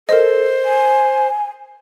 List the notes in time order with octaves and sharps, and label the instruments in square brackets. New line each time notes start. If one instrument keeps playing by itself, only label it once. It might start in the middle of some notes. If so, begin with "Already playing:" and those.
[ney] A4 [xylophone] A#4 D#5 [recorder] C5
[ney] G#5